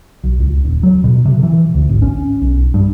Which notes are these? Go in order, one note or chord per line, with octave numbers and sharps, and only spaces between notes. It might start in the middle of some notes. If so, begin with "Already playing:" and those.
B1
C#2
D#1
F#3
B2
C3
E3
D2
G#1
C#4
B1
G2